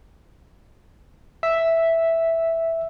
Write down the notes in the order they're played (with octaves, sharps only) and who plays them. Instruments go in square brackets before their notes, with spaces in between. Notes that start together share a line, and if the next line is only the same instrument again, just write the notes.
[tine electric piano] E5